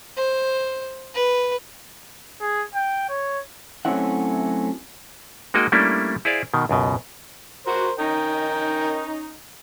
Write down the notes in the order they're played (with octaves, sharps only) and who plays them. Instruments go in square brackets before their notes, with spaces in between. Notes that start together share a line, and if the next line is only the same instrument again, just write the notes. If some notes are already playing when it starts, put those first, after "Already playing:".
[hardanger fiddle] C5
B4
[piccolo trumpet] G#4
G5
C#5
[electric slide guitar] F#3 A3 C4 C#4 E4 F#5
[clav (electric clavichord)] G#3 A#3 D#4 F#4 D#5 G5
G3 A3 A#3 C#4 D4 E4
E4 G#4 C5 D5 F5
B2 D#3
C#2 F#2 B2
[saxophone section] F#4 [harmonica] A#4 C5
[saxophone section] C#4 D#4 [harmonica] A#4 G5